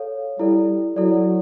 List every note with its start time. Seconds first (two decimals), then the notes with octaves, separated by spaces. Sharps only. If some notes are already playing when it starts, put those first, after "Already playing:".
Already playing: A4 C#5 F5
0.39 G3 E4 A4 D5
0.96 F#3 E4 A4 D5